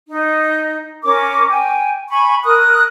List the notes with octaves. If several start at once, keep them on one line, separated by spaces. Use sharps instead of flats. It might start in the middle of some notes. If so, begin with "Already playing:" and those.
D#4
C#4 A#4 D6
G5 G#5
G#5 B5 C#6
A#4 D#6 F#6